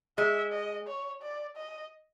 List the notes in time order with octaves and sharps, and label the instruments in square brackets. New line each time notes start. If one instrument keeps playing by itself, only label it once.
[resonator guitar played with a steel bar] G#3 [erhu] E5
[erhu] D#5
C#5
D5
D#5